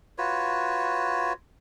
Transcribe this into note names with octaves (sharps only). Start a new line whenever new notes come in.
F4 F#4 B4 C#5